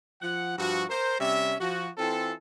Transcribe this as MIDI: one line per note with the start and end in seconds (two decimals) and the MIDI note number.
0.21 0.56 53
0.21 0.56 78
0.58 0.84 43
0.58 0.84 53
0.58 0.84 66
0.89 1.18 70
0.89 1.18 72
1.19 1.54 48
1.19 1.54 55
1.19 1.54 61
1.19 1.54 76
1.60 1.89 53
1.60 1.89 66
1.98 2.32 52
1.98 2.32 60
1.98 2.32 65
1.98 2.32 69